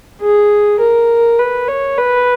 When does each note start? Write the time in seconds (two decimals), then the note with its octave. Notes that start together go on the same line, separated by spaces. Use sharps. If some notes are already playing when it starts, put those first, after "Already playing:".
0.21 G#4
0.80 A#4
1.39 B4
1.68 C#5
1.98 B4